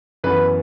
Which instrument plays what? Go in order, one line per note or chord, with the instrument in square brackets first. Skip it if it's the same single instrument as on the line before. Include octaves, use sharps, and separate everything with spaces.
[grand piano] F#2 E3 B3 B4